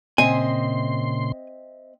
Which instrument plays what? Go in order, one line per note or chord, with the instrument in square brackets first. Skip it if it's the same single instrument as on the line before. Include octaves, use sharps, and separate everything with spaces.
[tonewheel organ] A#2 C#3 C6 [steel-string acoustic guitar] C4 D#5 E5 [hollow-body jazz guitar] G#5